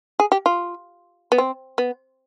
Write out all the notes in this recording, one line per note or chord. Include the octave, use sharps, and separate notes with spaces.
G#4
G4
F4
B3
C4
B3